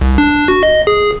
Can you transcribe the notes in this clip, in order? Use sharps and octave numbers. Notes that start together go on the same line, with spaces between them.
C2
D4
F#4
D#5
G#4